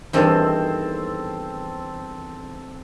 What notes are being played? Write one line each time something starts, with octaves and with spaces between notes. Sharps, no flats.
E2 G2 D#3 C4 A4